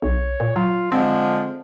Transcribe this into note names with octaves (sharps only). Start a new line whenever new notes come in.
B1 C#5
A#2
F#3 F4
D3 F3 G#3 C4